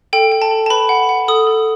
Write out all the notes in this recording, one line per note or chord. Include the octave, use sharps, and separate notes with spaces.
A4 G5
G5
A5
A4
A5
B4 B5
F#5
F#5
A4 D#6
A4